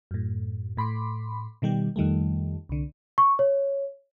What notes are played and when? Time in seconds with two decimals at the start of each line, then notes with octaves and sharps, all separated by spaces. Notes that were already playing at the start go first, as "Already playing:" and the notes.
0.11 F#2 A2
0.77 A2 B5 C6 D6
1.62 B2 D#3 G3 G4
1.96 F2 D#3 G3 A3
2.69 C2 D3
3.18 C#6
3.39 C#5